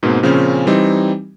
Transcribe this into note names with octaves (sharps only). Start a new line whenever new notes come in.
G#2 B2 A#3 C4
A#2 C#3 F3 C4 C#4
E3 G3 C4 D#4